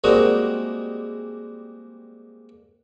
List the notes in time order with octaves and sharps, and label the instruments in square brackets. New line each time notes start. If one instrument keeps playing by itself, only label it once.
[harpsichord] G3 G#3 A#3 C4 D#4 F#4